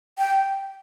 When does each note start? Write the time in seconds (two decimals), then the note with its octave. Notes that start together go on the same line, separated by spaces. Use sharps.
0.18 G5